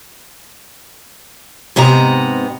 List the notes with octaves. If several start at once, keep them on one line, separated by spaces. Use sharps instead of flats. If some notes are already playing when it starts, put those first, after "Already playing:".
G#2 C3 B3 D#5 A#5